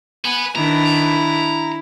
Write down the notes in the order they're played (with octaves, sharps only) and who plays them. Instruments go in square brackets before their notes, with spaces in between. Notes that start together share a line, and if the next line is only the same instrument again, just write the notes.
[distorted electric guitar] B4 F#5 [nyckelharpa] G#5
[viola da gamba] D#3 D4 B4 [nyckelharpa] E4 [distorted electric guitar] A#5